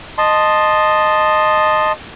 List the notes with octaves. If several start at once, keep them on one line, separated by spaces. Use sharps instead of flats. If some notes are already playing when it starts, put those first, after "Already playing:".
D#5 A5 C6